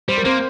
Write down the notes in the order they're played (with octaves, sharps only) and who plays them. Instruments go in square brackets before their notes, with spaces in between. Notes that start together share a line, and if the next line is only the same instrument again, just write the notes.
[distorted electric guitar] G3 [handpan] C5
[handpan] A#4
[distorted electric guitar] A#3 [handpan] C4 C5